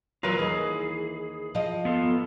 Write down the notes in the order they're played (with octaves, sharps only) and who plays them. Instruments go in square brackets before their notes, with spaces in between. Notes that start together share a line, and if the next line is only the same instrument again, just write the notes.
[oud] E2 F#3 [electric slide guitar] F4 A#4 B4
[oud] D#2 E3 [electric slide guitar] G#4
[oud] F3 D#5
[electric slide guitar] B3 F4 A4